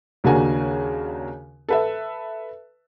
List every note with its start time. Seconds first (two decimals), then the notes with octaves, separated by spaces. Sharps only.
0.24 D#2 C#3 A#3 D4 F#4 G#5
1.69 A4 B4 E5